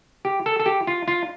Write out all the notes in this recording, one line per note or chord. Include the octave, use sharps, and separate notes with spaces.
G4
A4
A4
G4
F4
F4